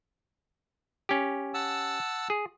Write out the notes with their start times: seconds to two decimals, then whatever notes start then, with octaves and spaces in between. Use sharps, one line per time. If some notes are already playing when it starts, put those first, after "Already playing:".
1.09 C#4 G4
1.54 F#5 A5 E6
2.30 G#4